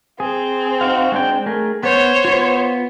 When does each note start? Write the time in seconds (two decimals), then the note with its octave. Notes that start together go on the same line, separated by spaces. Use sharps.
0.20 C4 G#4
0.81 D#4 F#4 F5
1.12 G#3 D4 G5
1.46 A3 G#4 A#4
1.83 B3 C5 C#5 G6
2.25 B3 F4